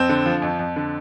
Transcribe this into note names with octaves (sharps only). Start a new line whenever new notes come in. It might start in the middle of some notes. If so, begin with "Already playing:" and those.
Already playing: F2 C4
D3
F3
F2
F2
D3